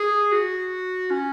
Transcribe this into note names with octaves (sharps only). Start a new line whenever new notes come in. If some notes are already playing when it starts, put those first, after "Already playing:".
Already playing: G#4
F#4
C#4